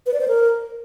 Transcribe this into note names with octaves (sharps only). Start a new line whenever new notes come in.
B4
D5
C5
A#4